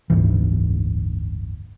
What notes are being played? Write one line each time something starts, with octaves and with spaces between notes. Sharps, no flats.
F#1 D2 G#2 E3